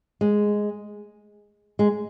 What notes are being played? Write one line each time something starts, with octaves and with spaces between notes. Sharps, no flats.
G#3
G#3